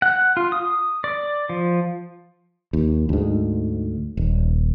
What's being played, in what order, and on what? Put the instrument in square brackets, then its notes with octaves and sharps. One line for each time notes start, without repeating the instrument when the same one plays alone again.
[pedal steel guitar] F#5
F4
D#6
D5
F3
[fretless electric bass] D#2
D2 G#2
D#1